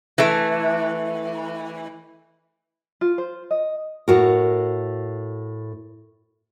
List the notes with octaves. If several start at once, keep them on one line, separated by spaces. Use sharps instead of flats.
E3 A3
F4
C5
D#5
A2 F#4 A#4